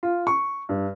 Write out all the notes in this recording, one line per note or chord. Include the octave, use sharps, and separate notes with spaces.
F4
C#6
G2